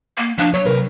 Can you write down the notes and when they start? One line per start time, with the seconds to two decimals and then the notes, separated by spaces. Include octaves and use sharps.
0.18 A#3
0.38 F3 D4 F5
0.54 F#3 C#5
0.66 C3 A#4 B4